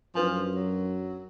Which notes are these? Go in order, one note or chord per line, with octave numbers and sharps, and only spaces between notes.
F#2 F3 D4 B4 G#5
F#3